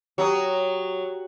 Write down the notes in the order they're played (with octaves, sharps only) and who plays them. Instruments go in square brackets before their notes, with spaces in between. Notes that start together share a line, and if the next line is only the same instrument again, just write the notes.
[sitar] F#3 [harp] G4 A#5 D#6